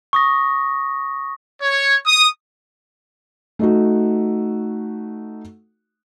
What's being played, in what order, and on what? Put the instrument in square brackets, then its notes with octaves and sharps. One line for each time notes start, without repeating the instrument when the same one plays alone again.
[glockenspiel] C#6 D#6 A#6
[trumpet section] C#5
D#6
[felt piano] A3 D#4 F#4